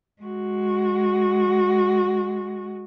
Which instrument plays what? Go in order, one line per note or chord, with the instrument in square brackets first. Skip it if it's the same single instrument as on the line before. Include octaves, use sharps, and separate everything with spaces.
[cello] G#3 F#4